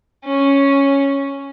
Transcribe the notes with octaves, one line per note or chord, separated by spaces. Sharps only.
C#4